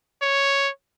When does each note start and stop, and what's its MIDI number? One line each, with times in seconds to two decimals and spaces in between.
0.22 0.69 73